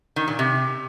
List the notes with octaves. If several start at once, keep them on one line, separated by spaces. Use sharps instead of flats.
D#3
A#2
C3